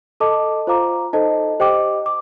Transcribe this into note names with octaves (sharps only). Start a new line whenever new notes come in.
A4 D#5 A5 D6
F4 C5 F5 A#5 D6
D#4 A4 C5 D#5 A5
G4 C5 D#5 G5 D6
D6